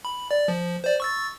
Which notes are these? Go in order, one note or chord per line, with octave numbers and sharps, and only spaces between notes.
B5
D5
F3
C5 D5
C#6 E6 A6